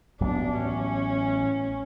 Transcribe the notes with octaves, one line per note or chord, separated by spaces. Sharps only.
A1 A2 F#3 B3 D4
C#4